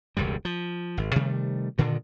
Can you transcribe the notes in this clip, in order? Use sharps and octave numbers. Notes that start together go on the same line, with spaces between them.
E1 C#2 G2 G3
F3
G#1
C3 D#3 G3 A3
G2 A#2 D3 D#3